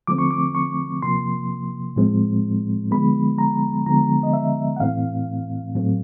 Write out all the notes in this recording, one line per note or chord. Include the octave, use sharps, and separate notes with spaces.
D3 F3 A3 C4 D6
C#6
D6
C#6
C3 F3 A#3 C6
A2 F3 G#3 C4
D3 F3 G#3 B3 B5
A#5
D3 F3 G#3 B3 A#5
D#5
E5
F#5
A2 E3 A3 C4 F5
A2 F#3 A3 C4